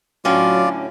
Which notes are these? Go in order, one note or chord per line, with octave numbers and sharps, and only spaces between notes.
A2 D3 F#3 C#4 F4 D5